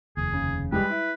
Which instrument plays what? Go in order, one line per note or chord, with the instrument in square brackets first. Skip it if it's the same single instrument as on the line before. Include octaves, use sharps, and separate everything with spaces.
[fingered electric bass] F1 D#2 [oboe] G#4
[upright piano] C#3
[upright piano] G3 G#3 G4 [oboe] B4
[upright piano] E4